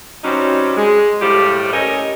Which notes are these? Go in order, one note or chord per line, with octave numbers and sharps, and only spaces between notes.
F#3 G3 C4 C#4 D#4
G#3
A2 F3 G3 G4
C#4 A4 A#4 D#5